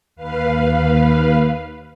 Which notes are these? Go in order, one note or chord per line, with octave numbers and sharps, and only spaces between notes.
D#2 B4 F5